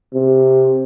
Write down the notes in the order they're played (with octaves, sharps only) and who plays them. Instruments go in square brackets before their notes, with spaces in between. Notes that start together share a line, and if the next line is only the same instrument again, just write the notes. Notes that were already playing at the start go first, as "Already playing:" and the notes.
[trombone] C3